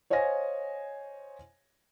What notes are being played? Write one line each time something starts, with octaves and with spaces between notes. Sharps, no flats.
C5 C#5 D#5 F5 G#5 A#6